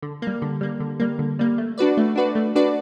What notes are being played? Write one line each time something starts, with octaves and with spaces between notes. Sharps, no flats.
D3
G3 A#3
D3
G3 A#3
D3
G3 A#3
D3
G3 A#3
A3
D4 F#4 B4 D5
A3
D4 F#4 B4 D5
A3
D4 F#4 B4 D5